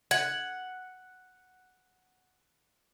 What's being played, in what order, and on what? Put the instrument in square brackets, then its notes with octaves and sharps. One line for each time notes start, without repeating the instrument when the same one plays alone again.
[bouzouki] F#5 [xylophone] G#6